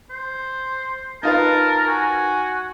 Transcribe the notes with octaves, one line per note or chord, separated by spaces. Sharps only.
C5
D#4 F4 A#4 B4 A5
F#4 G#5